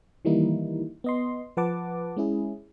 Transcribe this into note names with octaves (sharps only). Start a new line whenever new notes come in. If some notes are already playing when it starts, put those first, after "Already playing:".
D#3 E3 G3 A#3 D#4 E4
B3 D#5 C6
F3 B4 F#5 A5 D6
G#3 C#4 E4 G#4